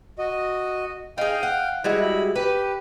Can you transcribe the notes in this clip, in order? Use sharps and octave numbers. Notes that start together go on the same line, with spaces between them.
F#4 D#5
D#4 G#4 F5 G5
F#5
G3 G#3 E4 F#4
E4 B5
G4 B4